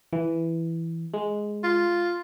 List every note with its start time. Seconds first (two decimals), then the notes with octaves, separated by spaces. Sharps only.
0.13 E3
1.14 G#3
1.63 F4